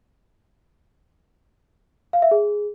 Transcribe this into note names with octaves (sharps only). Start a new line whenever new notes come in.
F5
E5
G#4